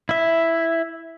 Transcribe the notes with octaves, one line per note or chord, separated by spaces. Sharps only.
E4 E5